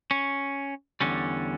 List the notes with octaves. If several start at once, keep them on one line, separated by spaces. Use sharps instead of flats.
C#4
E2 D3 G3 C#4